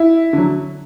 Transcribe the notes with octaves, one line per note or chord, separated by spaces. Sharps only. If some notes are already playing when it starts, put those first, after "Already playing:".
Already playing: E4
D3 F#3